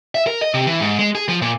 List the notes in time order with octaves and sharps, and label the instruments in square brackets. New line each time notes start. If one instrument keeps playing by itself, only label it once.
[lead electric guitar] E5
A#4
D#5
C3
E3
G#2
G#3
G#4
F3
A#2